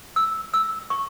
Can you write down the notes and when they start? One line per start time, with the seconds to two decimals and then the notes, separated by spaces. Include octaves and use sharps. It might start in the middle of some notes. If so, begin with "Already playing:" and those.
0.16 E6
0.54 E6
0.90 C#6